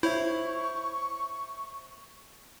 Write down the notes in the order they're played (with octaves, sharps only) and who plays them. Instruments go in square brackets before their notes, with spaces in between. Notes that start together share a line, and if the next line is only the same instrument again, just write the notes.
[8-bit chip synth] E4 [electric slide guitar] C5 C#5 E5 [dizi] C#6